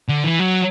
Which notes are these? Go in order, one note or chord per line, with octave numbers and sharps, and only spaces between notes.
D3
E3
F#3